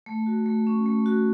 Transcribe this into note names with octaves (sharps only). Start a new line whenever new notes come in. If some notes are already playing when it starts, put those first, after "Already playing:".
A3
F#4
A3
C#4
A3
F#4